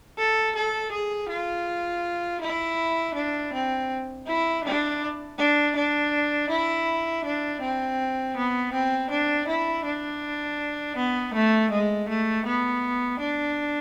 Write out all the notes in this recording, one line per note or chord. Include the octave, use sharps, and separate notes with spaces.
A4
A4
G#4
F4
E4
D4
C4
E4
D4
D4
D4
E4
D4
C4
B3
C4
D4
E4
D4
B3
A3
G#3
A3
B3
D4